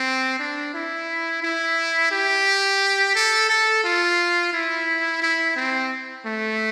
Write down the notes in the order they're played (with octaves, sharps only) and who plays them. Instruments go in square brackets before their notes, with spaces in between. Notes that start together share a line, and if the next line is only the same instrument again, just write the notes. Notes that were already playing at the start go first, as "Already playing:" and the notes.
Already playing: [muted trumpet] C4
D4
E4
E4
G4
A4
A4
F4
E4
E4
C4
A3